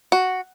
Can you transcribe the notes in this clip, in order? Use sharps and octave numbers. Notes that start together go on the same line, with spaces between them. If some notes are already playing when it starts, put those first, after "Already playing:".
F#4